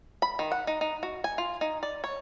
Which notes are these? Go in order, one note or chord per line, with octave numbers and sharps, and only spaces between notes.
B5
D#3
F#5
D#4
D#4
F#4
G#5
F4
D#4
D5
C#5